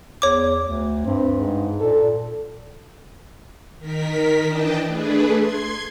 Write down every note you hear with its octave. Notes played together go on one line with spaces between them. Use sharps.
E2 C#5 D6
D2
G2 C4
G#2
A#2 A4
D#3 A#4 B6
E3 D4 D#5 G5 A5
A3 D4 G#4 B4
C6 G#6